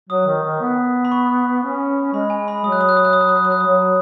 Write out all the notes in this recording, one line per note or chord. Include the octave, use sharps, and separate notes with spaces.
F#3 D#6
D#3
D#3
B3
B5
C#6
C#4
G#3 B5
G#5
B5
F#3 D#6
F#6
D#6
F#6
D#6
F#6
D#6
F#6
D#6
F#6
D#6
F#6
D#6
F#3